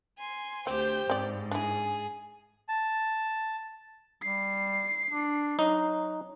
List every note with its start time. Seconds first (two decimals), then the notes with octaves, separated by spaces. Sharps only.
0.17 G#5 C6
0.67 D2 C4 G4 C5 G5 G6
1.10 G#2 C4 D5
1.51 D4 E4 G#4
2.69 A5
4.22 G3 C7
5.11 D4
5.59 F#3 D#4